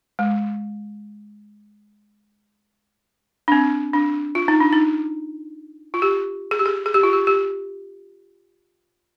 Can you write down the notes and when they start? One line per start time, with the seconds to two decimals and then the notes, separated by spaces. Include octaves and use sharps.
0.19 G#3
3.48 D4
3.52 C4
3.94 D4
4.35 F4
4.48 D#4
4.60 D4
4.73 D#4
5.94 F4
6.02 G4
6.51 G#4
6.59 G4
6.66 G#4
6.86 G#4
6.94 G4
7.03 F4
7.13 G4
7.27 G4